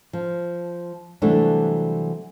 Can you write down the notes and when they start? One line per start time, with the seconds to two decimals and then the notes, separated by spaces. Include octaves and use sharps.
0.13 F3
1.22 C3 E3 F#3 G3 A3 D4